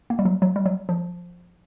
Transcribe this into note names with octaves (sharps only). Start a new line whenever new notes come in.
A#3
G3
F#3
F#3
G3
F#3
F3